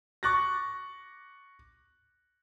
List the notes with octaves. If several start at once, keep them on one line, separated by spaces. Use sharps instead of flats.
C#6 D6 F#6 A6 A#6